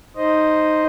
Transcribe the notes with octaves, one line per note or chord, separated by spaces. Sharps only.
D#4 C5 D#5